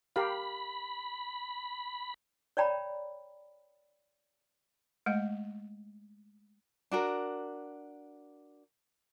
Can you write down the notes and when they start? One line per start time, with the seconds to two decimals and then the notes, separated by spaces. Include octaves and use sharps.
0.16 G4 A#4 F5 B5
2.57 C#5 D5 G5 A#5 B5
5.06 G#3 A3 D#5
6.91 D4 F#4 A#4